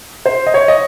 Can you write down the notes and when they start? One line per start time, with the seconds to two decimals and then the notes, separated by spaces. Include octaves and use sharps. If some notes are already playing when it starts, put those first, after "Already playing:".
0.26 C5
0.47 D#5
0.54 C#5
0.68 D#5